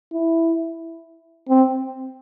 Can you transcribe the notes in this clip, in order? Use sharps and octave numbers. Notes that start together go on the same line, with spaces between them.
E4
C4